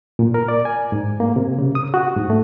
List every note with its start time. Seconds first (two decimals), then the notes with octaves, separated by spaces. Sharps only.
0.19 A#2
0.34 A#4
0.48 D5
0.65 G#5
0.92 G#2
1.20 A#3
1.36 C3
1.59 C#3
1.75 D#6
1.94 F#4
2.16 G#2
2.30 A3